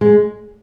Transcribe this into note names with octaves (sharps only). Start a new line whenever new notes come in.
G#3